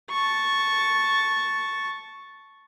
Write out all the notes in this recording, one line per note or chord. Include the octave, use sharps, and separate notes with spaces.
A5 C#6